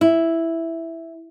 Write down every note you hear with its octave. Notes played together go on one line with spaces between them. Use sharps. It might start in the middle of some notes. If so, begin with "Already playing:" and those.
E4